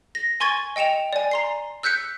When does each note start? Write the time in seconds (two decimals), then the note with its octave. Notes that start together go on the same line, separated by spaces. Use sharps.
0.15 A#6
0.40 G#5 C6 C#6 G#6 A6 D#7
0.76 D#5 G5 C#7 E7 F7
1.13 D5 G#5
1.31 A#5 C6 C7
1.83 E6 F#6 G6 B6 C#7